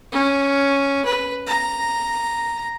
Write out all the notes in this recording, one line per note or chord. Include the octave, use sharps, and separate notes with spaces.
C#4
B4
A#5